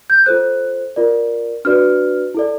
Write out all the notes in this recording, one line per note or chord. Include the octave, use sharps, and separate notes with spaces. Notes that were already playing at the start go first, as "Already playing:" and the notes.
G6
F4 A4 C5 F#6
F4 A#4 D5
D4 F#4 B4 D5 F6
E4 A4 D5